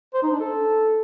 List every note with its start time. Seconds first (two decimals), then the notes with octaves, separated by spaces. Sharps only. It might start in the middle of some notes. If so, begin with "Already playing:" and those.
0.14 C5
0.23 D#4
0.31 D4
0.40 A4